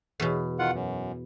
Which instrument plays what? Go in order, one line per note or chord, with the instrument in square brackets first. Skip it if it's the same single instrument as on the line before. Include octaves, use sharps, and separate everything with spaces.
[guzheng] E2 B2
[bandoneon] D#3 F4 F#5
F#2